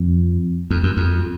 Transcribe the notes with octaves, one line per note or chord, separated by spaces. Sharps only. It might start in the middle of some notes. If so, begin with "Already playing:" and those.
Already playing: F2
F2
F#2
F2